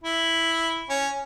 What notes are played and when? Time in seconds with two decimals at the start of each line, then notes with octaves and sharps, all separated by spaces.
0.04 E4
0.89 C#4